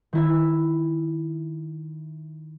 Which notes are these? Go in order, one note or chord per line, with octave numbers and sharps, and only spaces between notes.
D#3 E4 E5